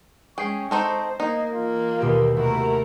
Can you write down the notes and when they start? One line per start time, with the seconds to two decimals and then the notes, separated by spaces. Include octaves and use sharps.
0.38 G#3 C#4 G#4 G5 C#6 C7
0.71 C4 D#4 A4 C5
1.20 A#3 D#4 D#5
1.53 E3 A#3 F4
2.00 D#2 B2 G4
2.36 C3 A3 E4 F#4 A#4